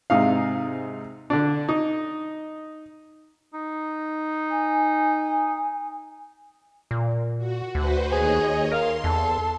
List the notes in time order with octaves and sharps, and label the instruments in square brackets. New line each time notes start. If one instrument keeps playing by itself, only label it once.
[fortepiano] G#2 C3 D#4 F5
D3 D4
D#4
[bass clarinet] D#4
[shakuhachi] G#5
[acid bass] A#2
[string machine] F#4
[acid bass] D2 [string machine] F#4 B4 C5
[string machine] D#2 C#5 D#5 [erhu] G#4
[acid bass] A#4 [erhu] F5 [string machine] C6
[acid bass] E2 [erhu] A4